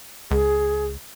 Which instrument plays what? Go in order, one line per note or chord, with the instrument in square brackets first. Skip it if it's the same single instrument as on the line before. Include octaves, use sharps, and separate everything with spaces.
[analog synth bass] C#2 [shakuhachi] G#4